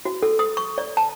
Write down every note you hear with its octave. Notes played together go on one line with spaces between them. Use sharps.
F#4
A4
D#6
C#6
D5
A5